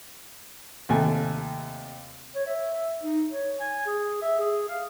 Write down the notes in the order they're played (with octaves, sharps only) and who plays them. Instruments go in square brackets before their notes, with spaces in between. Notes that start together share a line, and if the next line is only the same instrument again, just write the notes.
[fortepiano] D#2 C3 A3 G#5
[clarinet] C#5
E5
E5
D#4
C#5
G#5
G#4
E5
G#4
F5